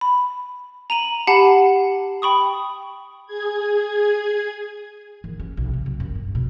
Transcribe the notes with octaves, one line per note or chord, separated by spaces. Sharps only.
B5
A#5 D#7 F#7
G4 F#5 A5 B5 C7
G5 B5 C#6 D#6
G#4 G#6
D#3
C#4
B1
C#3
F#3
F#2
G2
B2